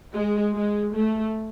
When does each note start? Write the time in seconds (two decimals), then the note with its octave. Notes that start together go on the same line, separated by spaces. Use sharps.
0.14 G#3
0.54 G#3
0.94 A3